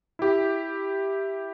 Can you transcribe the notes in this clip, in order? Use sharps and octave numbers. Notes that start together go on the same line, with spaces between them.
E4 G4